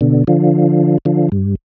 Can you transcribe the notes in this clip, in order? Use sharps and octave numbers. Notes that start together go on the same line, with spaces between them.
B2 D3
D3 F3
D3 F3
G2